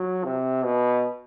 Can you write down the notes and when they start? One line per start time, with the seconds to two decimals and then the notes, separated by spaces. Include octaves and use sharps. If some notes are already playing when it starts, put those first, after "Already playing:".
Already playing: F#3
0.24 C3
0.64 B2